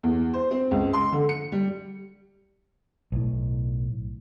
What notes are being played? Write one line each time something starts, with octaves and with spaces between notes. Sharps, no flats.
E2
C5
C4
C#2
C6
D3
C#7
G3
B1 A2